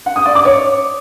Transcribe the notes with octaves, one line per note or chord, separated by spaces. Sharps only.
F#5
D#6
D5
D6
C#5